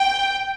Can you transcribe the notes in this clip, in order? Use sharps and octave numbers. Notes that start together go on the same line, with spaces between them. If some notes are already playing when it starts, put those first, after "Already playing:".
Already playing: G5